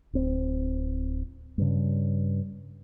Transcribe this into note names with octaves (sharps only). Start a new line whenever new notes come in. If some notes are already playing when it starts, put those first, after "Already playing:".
D1 C4
G2 C#3